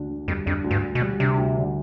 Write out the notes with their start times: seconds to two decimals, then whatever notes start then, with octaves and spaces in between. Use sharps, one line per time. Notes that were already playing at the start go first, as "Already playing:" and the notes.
Already playing: D2 D4
0.09 D3
0.28 F2 G3
0.46 F2 D4
0.64 D2
0.71 G2
0.82 D3
0.95 B2
1.02 G3
1.20 C3 D4
1.38 D2
1.57 D3